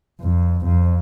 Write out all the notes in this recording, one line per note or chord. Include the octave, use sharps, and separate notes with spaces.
F2
F2